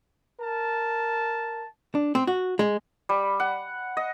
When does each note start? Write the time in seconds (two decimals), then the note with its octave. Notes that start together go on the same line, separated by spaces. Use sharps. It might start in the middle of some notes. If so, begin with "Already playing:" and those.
0.41 A#4 A5
1.95 D4
2.15 C4
2.27 F#4
2.59 G#3
3.09 G3
3.40 F#5
3.97 D#5